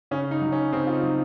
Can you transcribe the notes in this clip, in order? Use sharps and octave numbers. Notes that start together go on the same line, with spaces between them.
C#3 C#4
D#4
F#3
C#4
C#3 C4
F4
D#4
F#3